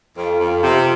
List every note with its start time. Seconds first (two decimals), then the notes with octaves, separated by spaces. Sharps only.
0.17 F2 F4
0.39 F2
0.62 C3